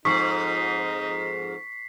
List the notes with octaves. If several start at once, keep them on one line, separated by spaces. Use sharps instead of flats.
F2 G#2 D#4 C#6 B6 C7